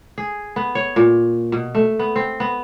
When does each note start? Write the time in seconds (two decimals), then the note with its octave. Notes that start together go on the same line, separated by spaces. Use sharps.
0.18 G#4
0.56 B3
0.75 C#5
0.96 A#2
1.52 B2
1.75 A3
1.99 B3
2.16 C4
2.40 B3